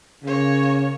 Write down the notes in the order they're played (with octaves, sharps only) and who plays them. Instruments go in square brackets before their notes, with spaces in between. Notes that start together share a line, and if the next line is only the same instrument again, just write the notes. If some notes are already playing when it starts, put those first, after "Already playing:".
[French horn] C#3 [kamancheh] A#3 C#5